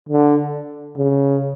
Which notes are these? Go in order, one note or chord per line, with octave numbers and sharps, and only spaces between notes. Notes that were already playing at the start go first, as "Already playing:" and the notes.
D3
C#3